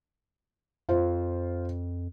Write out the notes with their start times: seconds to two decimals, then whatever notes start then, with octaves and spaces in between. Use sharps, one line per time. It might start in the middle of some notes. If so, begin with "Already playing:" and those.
0.89 F2 F4 C5